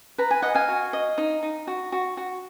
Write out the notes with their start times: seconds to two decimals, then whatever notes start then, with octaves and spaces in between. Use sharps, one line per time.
0.18 B4 A#5
0.31 G#5
0.42 D#5 F#5
0.55 F5 G#5
0.68 F#4
0.93 D#5
1.18 D#4
1.43 D#4
1.67 F#4
1.92 F#4
2.17 F#4